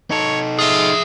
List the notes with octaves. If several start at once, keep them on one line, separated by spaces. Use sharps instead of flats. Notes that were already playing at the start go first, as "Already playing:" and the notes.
D#4 A4 C#5
F4 G#4 E5